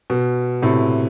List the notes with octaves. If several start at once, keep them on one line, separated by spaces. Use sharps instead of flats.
B2
A2 C3